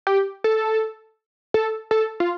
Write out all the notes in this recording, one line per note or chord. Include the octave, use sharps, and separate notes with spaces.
G4
A4
A4
A4
F4